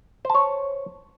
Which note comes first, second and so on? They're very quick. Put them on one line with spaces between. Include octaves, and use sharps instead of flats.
C5 A5 C#5